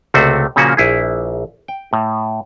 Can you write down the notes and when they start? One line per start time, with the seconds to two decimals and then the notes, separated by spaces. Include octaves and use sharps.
0.14 C#2 C3 A3 F#4 C5
0.56 A#2 C#3 F3 A#3 C#4 F#4
0.77 A#1 E4 G#4
1.68 G5
1.93 A2